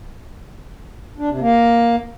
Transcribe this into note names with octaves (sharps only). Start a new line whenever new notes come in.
D4
C3
A#3